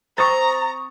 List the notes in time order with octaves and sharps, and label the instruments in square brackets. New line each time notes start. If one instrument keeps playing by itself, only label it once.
[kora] C4 C5 [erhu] A#5 [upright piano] C#6 D#6 A6